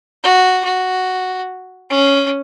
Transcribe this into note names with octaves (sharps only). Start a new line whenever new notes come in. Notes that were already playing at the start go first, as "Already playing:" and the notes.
F#4
F#4
C#4